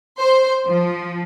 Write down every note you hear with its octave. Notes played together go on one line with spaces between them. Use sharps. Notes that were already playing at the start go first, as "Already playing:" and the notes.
C5
F3